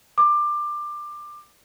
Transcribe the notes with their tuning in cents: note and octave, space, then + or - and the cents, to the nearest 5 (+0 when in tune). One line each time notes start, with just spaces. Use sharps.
D6 +20